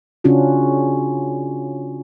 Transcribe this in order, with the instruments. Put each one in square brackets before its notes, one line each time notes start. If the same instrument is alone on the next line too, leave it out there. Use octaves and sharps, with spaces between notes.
[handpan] C#3 C#4 D4 F4 F#4